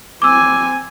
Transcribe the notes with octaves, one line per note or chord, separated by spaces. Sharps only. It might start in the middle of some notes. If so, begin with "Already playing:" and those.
C4 G#5 D6 E6